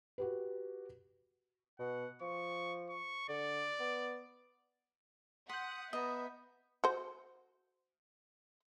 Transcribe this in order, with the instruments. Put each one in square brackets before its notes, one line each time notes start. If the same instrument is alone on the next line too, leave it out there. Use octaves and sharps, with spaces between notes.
[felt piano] F#4 G4 B4
[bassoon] B2 [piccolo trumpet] F#5
[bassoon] F3 [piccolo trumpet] C#6
[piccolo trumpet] C#6
[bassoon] D3 [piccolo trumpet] D5
[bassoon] B3
[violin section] F#5 [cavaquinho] C6 [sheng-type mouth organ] D#6 [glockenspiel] G6 B6
[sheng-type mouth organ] B3 [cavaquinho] D#5 A#5 [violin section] E5
[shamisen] F#4 C5